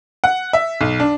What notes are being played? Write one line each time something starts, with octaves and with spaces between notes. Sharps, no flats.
F#5
E5
B1
D4